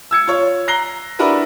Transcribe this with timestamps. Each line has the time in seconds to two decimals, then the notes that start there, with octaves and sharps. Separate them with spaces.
0.11 E6 G#6 C#7
0.27 F4 C#5
0.68 A#5 F#6 A#6 C7 G7
1.19 D4 E4 F#4 A#4 B4